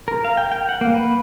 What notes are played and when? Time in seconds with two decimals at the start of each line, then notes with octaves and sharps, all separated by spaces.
0.08 A#4
0.25 F5
0.37 G5
0.52 G5
0.69 F#5
0.81 A#3
0.94 B4